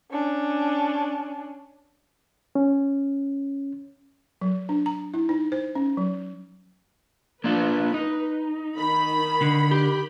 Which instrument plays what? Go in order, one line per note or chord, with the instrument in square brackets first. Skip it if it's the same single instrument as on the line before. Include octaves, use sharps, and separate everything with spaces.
[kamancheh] C#4 D4
[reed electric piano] C#4
[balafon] F#3
D4
A#5
E4
D#4
C5
C#4
F#3
[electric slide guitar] A#3 D4 F4 [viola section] B4
[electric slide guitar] D#4
[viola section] D#3 B5
[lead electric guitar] D3
[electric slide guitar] G4